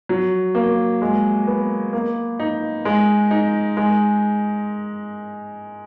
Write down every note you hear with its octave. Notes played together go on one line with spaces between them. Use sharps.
F#3
A#3
G#3
B3
A#3
D#4
G#3
D#4
G#3